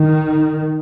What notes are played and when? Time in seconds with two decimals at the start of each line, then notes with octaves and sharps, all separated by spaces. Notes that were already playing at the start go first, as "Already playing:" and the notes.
Already playing: D#3